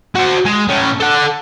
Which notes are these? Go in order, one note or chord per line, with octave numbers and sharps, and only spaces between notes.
F#4 C5
G#3
A2 C#4
A4 F#5